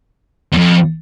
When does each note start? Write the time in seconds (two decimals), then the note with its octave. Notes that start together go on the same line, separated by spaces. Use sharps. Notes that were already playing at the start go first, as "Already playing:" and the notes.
0.53 E2
0.58 F2